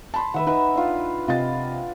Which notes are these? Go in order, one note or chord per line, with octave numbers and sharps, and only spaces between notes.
A5 B5 C6
D#3 B4 E5 F#5
D#4 B4 E5
D4 F4
C3 F4 D#5 A6